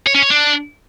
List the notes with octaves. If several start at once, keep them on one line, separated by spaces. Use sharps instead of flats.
C#5
C#4
C#5
D4